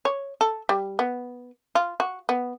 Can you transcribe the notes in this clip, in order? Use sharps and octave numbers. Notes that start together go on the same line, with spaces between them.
C#5
A4
G3
B3
F4
F#4
B3